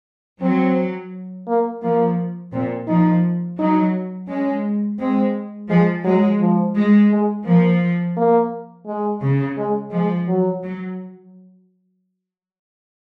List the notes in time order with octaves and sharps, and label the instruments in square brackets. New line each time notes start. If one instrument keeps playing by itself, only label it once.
[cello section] F#3 [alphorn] C4
[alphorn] A#3
[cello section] F3 [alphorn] A#3
[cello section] A#2 [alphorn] C4
[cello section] F3 [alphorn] D#4
[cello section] F#3 [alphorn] D#4
[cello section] G#3 [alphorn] C#4
[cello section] G#3 [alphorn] C4
[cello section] F3 [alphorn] G#3
[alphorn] F#3 [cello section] G#3
[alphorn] F3
[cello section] G#3
[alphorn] G#3
[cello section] F3 [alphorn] A#3
[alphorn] A#3
G#3
[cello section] C#3
[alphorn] G#3
[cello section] F3 [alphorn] G#3
[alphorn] F#3
[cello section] F#3